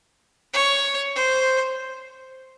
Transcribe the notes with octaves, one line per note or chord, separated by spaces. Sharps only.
C#5
C5